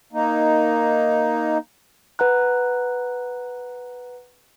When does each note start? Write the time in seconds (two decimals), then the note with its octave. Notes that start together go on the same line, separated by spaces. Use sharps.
0.13 A#3 D#4
2.19 B4 F#5 A#5 F#6